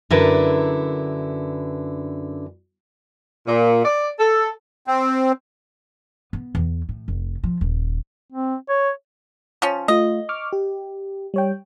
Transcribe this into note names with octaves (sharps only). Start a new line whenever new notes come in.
F#2 D3 D4 E4 A#4 B4
A#2
D5
A4
C4
B3
E2
A2
F1
F3
D#1
C4
C#5
F3 C#4
A3 F4 D#5
C#6 D6 F6
G4
G3 C#5 G5